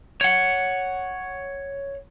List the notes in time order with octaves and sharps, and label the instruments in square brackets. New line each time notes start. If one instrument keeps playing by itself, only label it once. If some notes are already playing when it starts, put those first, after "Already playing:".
[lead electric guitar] C#5 F#5